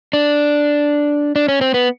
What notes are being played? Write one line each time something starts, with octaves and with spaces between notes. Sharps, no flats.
D4
D4
C#4
C4
B3